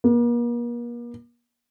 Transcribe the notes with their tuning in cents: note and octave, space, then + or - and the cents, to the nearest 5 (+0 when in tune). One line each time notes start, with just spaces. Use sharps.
A#3 +40